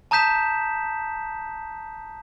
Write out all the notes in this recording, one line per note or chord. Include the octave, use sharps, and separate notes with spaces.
A5 A#5 D#6 G6 B6 E7